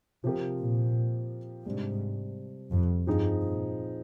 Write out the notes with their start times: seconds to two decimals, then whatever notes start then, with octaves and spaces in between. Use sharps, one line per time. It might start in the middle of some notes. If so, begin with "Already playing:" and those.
0.24 C3 F3 C4 G4 A#4
0.59 A#2
1.65 G#2 C3 G3 D4
2.72 F2
3.07 G2 F3 C4 D#4 G#4
3.42 A#2